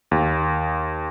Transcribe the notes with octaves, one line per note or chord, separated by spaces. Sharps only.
D#2